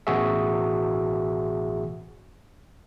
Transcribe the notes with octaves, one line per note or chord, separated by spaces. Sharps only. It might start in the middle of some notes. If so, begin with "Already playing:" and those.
A1 B2 F#4 G#4 E5